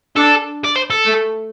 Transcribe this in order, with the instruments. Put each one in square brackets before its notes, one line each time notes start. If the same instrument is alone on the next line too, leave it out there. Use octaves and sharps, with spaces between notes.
[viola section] D4 [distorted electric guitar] A4
[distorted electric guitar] D5
C5
A4
[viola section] A3